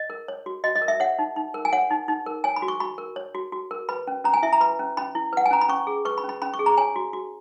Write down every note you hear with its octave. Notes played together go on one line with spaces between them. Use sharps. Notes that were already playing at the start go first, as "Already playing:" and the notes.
Already playing: D#5
A#4
C#5
F#4
F#4 D#5
D#5
A#4
E5
C#5 F#5
D#4
D#4
A#4
G#5
C#5 F#5
D#4
D#4
A#4
C#5 G#5
B5
F#4
C#6
F#4 B5
A#4
C#5
F#4
F#4
A#4
B4 B5
C#4
C#4 A#5
G#5
E4 E5
A#5
B4 B5
C#4
C#4 B5
E4
B4 F#5
G#5
C#4 A#5
B5
C#4 C#6
G#4
B4 C#6
B5
C#4
B5
C#4 B5
C#6
G#4
A#5
C#5 G#5
F#4
F#4